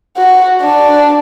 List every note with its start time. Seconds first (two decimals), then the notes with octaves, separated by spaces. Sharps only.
0.17 F#4
0.62 D4